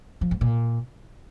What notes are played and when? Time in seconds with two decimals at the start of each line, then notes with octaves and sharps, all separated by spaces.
0.21 F3
0.31 G#2
0.41 A#2